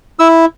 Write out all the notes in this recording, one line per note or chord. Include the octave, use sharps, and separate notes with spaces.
E4 E6